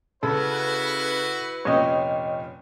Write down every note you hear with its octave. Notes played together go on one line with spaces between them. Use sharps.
C#3 E4 F#4 A4 B4
F1 A#2 C#4 C#5 D#5 G5